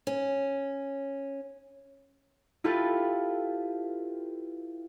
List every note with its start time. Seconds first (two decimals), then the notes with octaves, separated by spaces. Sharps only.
0.07 C#4
2.64 E4 F4 G4 A4 B4 F5